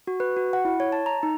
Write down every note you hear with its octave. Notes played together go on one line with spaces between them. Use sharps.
F#4
B4
F#4
F#5
E4
C#5
A5
A#5
D#4